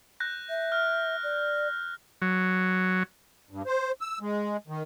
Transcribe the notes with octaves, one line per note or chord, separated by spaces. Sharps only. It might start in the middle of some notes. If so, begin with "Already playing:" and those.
F#6 G6 A#6
E5
F6
D5
F#3
G2
C5
E6
G#3
D#3